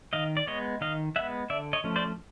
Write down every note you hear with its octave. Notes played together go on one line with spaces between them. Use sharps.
D#3 D#5 F5
D5
G#3 B3 C#5 D#5
D#3 D#5 F5
G#3 B3 E5 F#5
D3 D5 E5
C#5 D#5
F3 A3 C#4
C5 D5